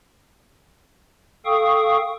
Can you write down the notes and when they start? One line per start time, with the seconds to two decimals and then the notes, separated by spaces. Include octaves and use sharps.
1.45 A4 F5 G5 C#6 D#6